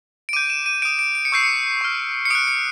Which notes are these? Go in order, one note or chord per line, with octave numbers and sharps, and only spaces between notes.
D7
D6 G6 D#7
E7
D#7
D#6 G6 D7
D7
D7
C#7
C#6 E6 G6 C7
C#7
C#6 F6
C#7
D#6 F#6 D7
C#7